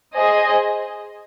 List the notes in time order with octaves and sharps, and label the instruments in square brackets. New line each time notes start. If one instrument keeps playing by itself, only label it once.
[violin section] G#4 C5 D#5 G#5